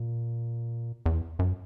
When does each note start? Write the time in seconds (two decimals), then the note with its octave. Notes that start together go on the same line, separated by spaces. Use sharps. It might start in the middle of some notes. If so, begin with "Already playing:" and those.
Already playing: A#2
1.06 E2
1.39 F#2